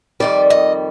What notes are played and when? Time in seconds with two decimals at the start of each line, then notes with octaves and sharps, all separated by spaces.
0.20 F2 D#3 G3 D5
0.50 D#5